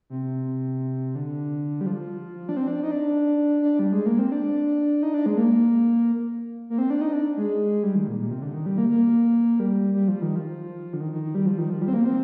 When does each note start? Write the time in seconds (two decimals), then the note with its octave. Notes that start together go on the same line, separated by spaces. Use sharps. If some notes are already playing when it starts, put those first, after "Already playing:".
0.10 C3
1.15 D3
1.81 G3
1.86 F3
2.49 D4
2.57 C4
2.68 D4
2.83 D#4
2.91 D4
3.62 D4
3.79 G3
3.93 G#3
4.06 A#3
4.19 C4
4.32 D4
5.03 D#4
5.14 D4
5.26 G#3
5.37 A#3
6.70 A#3
6.78 C4
6.90 D4
7.01 D#4
7.13 D4
7.37 G#3
7.83 G3
7.95 D#3
8.07 A#2
8.18 A#2
8.31 C3
8.42 D3
8.54 D#3
8.66 G3
8.78 A#3
8.89 A#3
9.60 G3
9.94 G3
10.08 F3
10.22 D#3
10.36 F3
10.93 D3
11.00 D#3
11.12 D#3
11.23 D#3
11.35 G3
11.46 F3
11.58 D#3
11.70 F3
11.82 G3
11.88 C4
11.93 A#3
12.05 C4